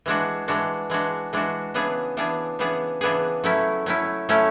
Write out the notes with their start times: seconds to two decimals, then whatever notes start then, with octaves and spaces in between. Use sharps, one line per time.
0.06 E3 G#3 D4 F#4
0.48 E3 G#3 D4 F#4
0.90 E3 G#3 D4 F#4
1.33 E3 G#3 D4 F#4
1.74 C#3 E3 B3 D4 G#4
2.17 C#3 E3 B3 D4 G#4
2.59 C#3 E3 B3 D4 G#4
3.01 C#3 E3 B3 D4 G#4
3.44 F#3 A3 C#4 E4
3.86 F#3 A3 C#4 E4
4.29 F#3 A3 C#4 E4